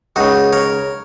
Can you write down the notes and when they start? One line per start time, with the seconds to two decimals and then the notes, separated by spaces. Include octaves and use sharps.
0.16 C#2 C#3 D#4 F#4
0.53 A#4 C#5